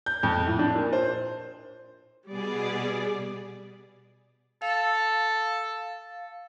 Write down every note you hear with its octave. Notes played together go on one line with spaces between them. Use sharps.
G6
F2
A2
D4
A#2
C5
B2 G3 B3 G#4 D5
A4 F5